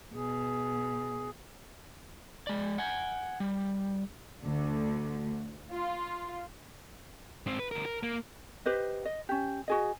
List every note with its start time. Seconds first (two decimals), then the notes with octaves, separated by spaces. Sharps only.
0.14 B2 G#4
2.47 G#3 D5
2.78 F#5 G#5
3.40 G3
4.43 D2 D3
5.72 F4
7.46 G#2 C4
7.59 B4
7.71 D2 A#4
7.86 A#4
8.03 A#3
8.66 G4 B4 C5 D#5
9.05 D#5
9.29 C#4 G4
9.68 F#4 G#4 D#5